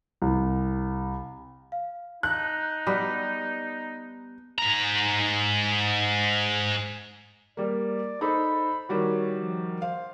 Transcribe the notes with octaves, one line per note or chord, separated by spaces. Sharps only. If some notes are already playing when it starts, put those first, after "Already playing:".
C2
F5
D#4 A5 F#6
G3 B3 B4
G#2 A#5
G3 A#3 D5
D#4 A4 C5 B5
D#3 G3 F#4 C#5
F3
C5 F5